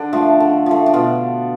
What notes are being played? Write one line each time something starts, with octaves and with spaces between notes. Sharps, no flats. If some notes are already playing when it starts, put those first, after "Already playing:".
Already playing: D3 D4
F3 A3
D3
F3 A3
D4
B2 F4